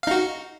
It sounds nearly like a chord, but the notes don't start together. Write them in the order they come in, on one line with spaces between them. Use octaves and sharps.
F5 D#4 F#4